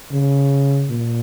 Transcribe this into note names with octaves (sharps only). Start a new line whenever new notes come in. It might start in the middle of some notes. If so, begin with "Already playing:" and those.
C#3
A#2